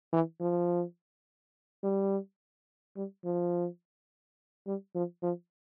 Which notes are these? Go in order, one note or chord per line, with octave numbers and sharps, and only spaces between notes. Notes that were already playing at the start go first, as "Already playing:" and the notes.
E3
F3
G3
G3
F3
G3
F3
F3